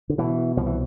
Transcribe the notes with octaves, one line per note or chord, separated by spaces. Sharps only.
D3
B2 E3
C2 F3
E3